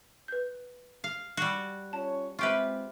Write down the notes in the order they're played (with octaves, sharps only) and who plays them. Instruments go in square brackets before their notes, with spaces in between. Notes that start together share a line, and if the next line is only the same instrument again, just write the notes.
[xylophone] B4 G6
[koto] F5
G3 F#4
[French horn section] C#4 F4 C#5 [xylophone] A5
[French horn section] G#3 C4 [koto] F4 G4 B4 [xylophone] E5 C#6